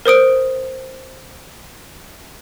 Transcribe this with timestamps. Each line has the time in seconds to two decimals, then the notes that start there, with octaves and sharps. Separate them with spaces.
0.05 A#4 C5 D#6 D7